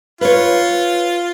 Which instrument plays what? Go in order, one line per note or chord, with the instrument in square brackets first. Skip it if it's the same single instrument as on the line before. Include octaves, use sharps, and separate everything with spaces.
[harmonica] F4 [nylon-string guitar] B4 C#5